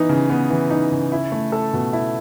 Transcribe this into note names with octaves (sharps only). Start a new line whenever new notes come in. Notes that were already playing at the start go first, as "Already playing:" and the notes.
Already playing: E3 B3 D#4
C#3
B3
E3
D#4
C#3
E4
A3
A4
B2
E4